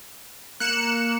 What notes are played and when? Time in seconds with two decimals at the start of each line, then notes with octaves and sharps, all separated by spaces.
0.60 A#3 F#6 C#7 E7